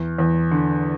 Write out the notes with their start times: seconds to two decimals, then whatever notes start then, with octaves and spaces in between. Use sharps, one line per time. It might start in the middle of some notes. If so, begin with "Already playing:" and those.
Already playing: E2
0.18 E2
0.51 D3